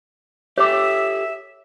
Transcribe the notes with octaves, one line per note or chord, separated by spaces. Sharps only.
G4 A4 C#5 E5 D6